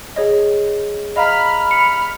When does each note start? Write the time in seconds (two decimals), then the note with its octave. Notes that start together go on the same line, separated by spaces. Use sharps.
0.16 G#4 C#5 D#5
1.16 D#5 F5 A#5 B5 F6
1.71 C#7